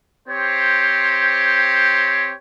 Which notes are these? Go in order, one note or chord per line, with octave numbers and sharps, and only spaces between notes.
C4 G4 C5 C#5